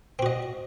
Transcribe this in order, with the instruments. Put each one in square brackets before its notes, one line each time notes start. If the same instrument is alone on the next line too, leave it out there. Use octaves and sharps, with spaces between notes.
[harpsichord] C4
F#4
D#5